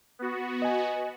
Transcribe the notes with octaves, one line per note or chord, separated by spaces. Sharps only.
B3 F#4
D#5 G#5